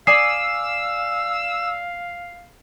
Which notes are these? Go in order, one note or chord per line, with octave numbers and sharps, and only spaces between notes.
D5 F5 G#5 D#6 E6 C7